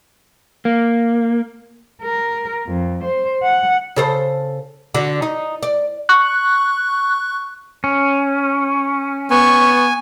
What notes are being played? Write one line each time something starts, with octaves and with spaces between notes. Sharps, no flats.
A#3
A#4
F2
C5
F#5
C#3 A4 C5
D3 F#4
D#4
D5
C#6 F#6
C#4
B3 G#5 C#6